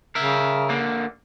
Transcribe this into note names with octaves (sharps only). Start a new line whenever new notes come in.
C#3 A#4 E5
D3 A#3